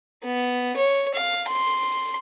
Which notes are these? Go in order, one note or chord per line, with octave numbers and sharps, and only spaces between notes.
B3
C#5
F5
C6